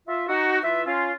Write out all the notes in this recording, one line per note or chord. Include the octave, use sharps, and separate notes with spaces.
F4 E5
D#4 F#4
E3 F4 B4 E5
C#4 F4